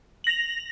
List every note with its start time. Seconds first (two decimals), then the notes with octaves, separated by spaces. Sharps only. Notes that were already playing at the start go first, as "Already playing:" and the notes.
0.24 F#7
0.27 A#6
0.29 F7